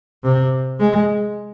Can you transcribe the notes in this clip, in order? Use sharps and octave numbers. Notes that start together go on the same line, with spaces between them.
C3
G#3